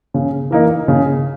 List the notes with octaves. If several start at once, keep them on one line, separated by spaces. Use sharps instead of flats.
C#3
E3 A#3 D#4
C#3